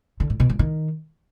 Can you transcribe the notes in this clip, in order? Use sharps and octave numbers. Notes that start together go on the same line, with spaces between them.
D3
A2
B2
G2
D#3